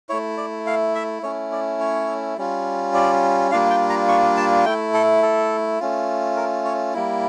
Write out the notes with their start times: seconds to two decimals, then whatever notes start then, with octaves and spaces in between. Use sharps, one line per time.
0.09 A3 E4 C#5
0.37 D5
0.67 F5
0.95 E5
1.23 A3 C#4 E4 C#5
1.52 D5
1.80 C#5
2.37 G3 C#4 F4
2.94 D5
3.51 G3 A#3 D4 F4 F5
3.70 G5
3.90 A#5
4.08 C#6
4.37 A5
4.65 A3 E4 G5
4.94 A4
5.22 A4
5.80 A3 C#4 F4
6.37 A#4
6.65 C#5
6.93 G3 A#3 E4